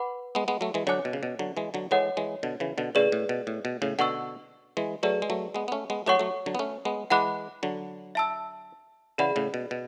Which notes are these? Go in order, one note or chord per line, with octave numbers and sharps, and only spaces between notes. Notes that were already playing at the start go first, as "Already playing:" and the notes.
Already playing: B4 F#5 B5 D6
G#3 B3
G#3 B3
F#3 A3
E3 G#3
D3 F#3 C#5 G#5 D6 F#6
B2
C#3
B2
D3 F#3
E3 G#3
D3 F#3
E3 G#3 A4 C#5 F#5
E3 G#3
B2 D3
C#3 E3
B2 D3
A2 C#3 G#4 B4 D5
A2
B2
A2
B2
A2 C#3
B2 D3 F#5 C#6 E6
E3 G#3
F#3 A3 G#4 B4 D5
G#3
F#3 A3
G#3 B3
B3
A3 C#4
G#3 B3
F#3 A3 A4 C#5 F#5 C#6
F#3 A3
D3 F#3
B3
A3 C#4
G#3 B3
E3 G#3 F#5 B5 D6 F#6
D3 F#3
E5 A5 E6
C#3 E3 G#4 D5 F#5 B5
A2 C#3
B2
B2